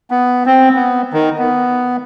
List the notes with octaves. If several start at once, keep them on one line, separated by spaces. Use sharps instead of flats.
B3
C4
B3
D#3
B3